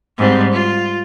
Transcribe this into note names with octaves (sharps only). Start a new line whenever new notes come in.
G#2 G3 C4
F4